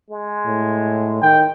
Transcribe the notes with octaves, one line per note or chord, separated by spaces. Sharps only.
G#3
A2
D#3 G5